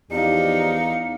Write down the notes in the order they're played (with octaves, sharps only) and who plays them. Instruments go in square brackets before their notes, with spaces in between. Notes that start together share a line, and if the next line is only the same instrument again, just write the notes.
[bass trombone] E2 [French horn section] F3 G4 D5 [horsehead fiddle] D#4 F5 [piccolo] C#7